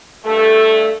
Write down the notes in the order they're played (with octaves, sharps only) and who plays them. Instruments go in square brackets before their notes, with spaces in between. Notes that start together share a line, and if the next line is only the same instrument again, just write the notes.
[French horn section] G2 A3 [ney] A4